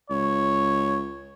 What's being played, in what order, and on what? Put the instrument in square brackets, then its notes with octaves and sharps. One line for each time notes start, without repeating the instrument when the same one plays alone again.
[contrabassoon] C#2 [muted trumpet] C#5